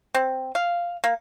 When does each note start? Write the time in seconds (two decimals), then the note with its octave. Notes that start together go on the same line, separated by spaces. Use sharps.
0.15 C4
0.55 F5
1.04 A#3